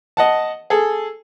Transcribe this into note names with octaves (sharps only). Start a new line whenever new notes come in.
D#5 F#5 A5
G#4 A4